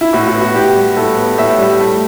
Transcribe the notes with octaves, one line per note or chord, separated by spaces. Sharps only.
E4
A2 F#4
F#4
B3
F#4
A2 G4
G3
A2 A4
B3
A2 E5
G3
A3